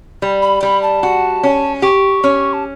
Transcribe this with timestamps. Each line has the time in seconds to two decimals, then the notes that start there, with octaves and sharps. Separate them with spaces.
0.22 G3
0.42 B5
0.63 G3 B5
0.83 A5
1.03 F#4
1.43 C#4
1.82 G4 C#6
2.24 C#4
2.53 A5